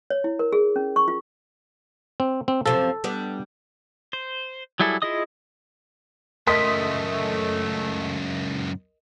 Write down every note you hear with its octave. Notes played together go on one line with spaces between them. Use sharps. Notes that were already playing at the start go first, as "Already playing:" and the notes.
C#5
E4
A#4
G#4
C#4
C#6
F4
C4
C4
F#2 C3 F3 A4
G3 B3 D4
C5
F#3 G3 E4 G#4 A4
E4 F4 G#4 D#5 D#6
C#2 F#2 A3 A#4 D#5 C6 D#6 B6